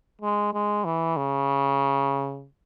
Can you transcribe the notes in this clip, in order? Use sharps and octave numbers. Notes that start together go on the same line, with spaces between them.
G#3
G#3
E3
C#3